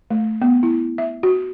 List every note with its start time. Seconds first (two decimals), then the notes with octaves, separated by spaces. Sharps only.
0.11 A3
0.42 B3
0.63 E4
0.98 E5
1.23 F#4